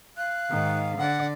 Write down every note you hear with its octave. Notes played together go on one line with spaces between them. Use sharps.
F5 F#6
G#2 D#3
D3 D5 F#5